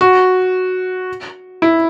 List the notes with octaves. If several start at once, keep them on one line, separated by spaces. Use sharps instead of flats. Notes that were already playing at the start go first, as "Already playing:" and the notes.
F#4
E4